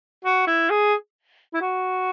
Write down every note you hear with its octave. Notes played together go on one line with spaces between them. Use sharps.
F#4
E4
G#4
E4
F#4